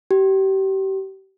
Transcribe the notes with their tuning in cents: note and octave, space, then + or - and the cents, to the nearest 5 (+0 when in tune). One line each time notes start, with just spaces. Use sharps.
G4 -30